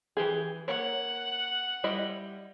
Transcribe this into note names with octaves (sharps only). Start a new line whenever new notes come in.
E3 G4 G#4
A#3 C#5 F#5
G3 E4 D#5